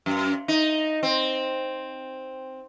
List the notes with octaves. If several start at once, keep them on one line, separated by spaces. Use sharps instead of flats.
F#2
D#4
C4